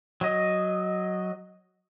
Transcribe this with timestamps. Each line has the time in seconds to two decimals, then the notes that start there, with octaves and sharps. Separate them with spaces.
0.21 F#3 D#5